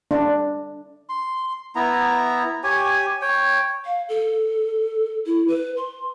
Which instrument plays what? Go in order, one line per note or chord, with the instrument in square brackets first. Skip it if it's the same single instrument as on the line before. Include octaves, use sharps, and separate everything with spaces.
[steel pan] D4
[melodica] C6
B3 E4 A#5
G4 C#5 G#5
C#5 G5
[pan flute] F5
A4
E4
B4
C6